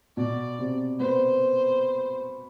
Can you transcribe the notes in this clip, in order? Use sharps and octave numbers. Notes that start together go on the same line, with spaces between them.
B2 D5
C3
B3 C5